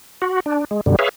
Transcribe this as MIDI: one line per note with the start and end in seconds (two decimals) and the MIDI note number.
0.22 0.40 66
0.46 0.65 62
0.71 0.81 56
0.86 0.96 42
0.86 0.96 47
0.86 0.96 50
0.86 0.96 55
0.99 1.09 68
0.99 1.09 71
0.99 1.09 73
0.99 1.09 76
0.99 1.09 77